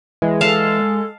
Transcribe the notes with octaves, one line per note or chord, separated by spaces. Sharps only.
E3 G#3
A4 F5 A5